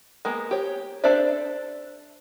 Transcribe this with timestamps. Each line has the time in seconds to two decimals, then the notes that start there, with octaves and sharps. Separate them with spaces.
0.25 G#3 A#3 B3
0.51 G4 C#5
1.04 D4 A4 C5 D5 E5